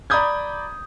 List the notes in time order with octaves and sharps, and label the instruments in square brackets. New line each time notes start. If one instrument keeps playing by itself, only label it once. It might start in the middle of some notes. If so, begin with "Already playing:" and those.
[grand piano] D5 A#5 B5 D#6 G6 G#6